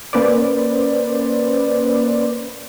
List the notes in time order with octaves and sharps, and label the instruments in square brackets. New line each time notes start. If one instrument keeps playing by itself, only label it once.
[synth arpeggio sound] A#3 C#4 B4 C5 D5